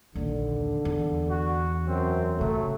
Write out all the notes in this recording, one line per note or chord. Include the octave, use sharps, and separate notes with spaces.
A#1 D#2 D3
E2
F#4
F#2 C4
D1 C3 F#3 A3